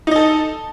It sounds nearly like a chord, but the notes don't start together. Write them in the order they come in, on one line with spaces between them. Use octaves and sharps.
D#4 D#5 A4